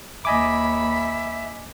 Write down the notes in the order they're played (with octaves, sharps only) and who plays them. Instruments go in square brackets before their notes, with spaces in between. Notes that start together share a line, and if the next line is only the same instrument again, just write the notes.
[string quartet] D#2 B5 [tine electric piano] D#5 G#5 D6 [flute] E5